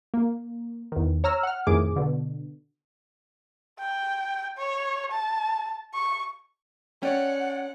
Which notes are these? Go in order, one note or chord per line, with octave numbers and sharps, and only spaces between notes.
A#3
E2 D#3
C#5 A#5 E6 F6
F#5 F6
F2 A2 D#3 G#4 D6
B2 D3
G5
C#5
A5
C#6
C#4 C#5 D5 F#5 G5